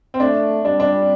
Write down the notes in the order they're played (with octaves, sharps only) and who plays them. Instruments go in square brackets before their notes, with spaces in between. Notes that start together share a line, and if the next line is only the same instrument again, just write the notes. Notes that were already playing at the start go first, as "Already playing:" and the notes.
[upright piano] C4
[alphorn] A3 [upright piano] D4
[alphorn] G3 [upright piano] D4
[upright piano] D4